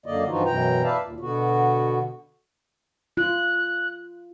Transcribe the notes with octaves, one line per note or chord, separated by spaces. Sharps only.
F#2 D3 A#3 D5 D#5
G2 E3 F3 D#4 F4 F#4
F#2 B2 E3 G5 A#5
B4 D5 E5 F5 A5
D#2 A#2
B2 D3 B3 F#4
F4 F#6